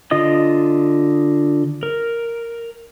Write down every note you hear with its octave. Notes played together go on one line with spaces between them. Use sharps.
D3 F4 D#5 D#6
A#4